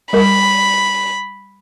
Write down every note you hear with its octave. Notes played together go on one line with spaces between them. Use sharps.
G3 A#4 B5